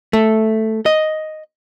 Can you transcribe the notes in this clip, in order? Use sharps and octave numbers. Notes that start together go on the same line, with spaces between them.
A3
D#5